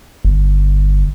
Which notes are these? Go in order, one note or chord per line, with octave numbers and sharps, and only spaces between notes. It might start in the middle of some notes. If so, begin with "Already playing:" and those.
G1